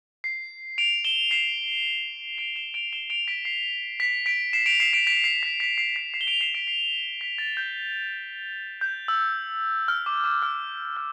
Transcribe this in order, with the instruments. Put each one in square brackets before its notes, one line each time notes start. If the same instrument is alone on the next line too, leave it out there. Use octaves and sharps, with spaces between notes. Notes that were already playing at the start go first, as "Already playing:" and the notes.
[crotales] C7
D7 F7
E7 G7
C7 E7
D7 F7
E7 G7
D7 F7
E7 G7
D7 F7
B6 D7
C7
B6
B6 D7
C7 E7
D7 F7
C7 E7
B6 D7
B6 D7
C7
B6
B6
C7
B6 D7
C7 E7
G7
D7 F7
C7 E7
B6 D7
C7
B6
A6
G6
G6
E6
F6
D6
D6
F6
F6